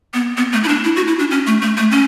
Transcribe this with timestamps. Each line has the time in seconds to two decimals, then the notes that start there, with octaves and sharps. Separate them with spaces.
0.14 B3
0.37 B3
0.53 A3
0.64 E4
0.68 D4
0.84 E4
0.96 F#4
1.08 E4
1.19 D4
1.31 C#4
1.47 A3
1.62 A3
1.77 A3
1.91 C#4